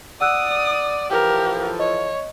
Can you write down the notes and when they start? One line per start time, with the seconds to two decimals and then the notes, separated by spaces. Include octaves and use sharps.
0.21 D5 F#5 D#6 E6 F#6
1.10 E3 F3 G4 A4 A#4
1.79 C#5 D#5